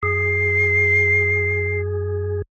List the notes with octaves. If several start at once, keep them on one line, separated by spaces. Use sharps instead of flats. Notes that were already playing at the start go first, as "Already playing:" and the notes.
F#2 G#4 C7